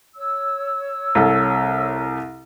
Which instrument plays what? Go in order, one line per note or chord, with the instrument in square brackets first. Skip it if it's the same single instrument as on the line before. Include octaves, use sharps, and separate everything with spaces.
[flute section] C#5 E6
[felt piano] C2 A4